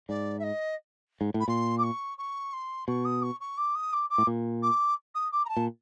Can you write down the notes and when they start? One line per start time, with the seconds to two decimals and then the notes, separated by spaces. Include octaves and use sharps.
0.09 G#2 D5
0.39 E5
0.44 D#5
1.21 G#2
1.34 A2
1.40 B5
1.48 A#2 C6
1.78 D6
1.83 C#6
2.18 C#6
2.53 C6
2.88 B2 C#6
3.05 D#6
3.22 C#6
3.40 C#6
3.57 D6
3.75 D#6
3.93 D6
4.10 D6
4.18 A2
4.27 A#2
4.62 D6
5.15 D#6
5.32 D6
5.45 A#5
5.49 A5
5.57 A#2